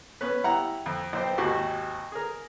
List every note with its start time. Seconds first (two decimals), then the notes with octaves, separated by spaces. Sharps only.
0.21 B3 C#4 B4
0.44 G3 E4 F#5 A#5 F#6
0.86 F2
1.13 B1 C5 G5
1.38 G#1 D#2 F#4 G4
2.12 G#4 A#4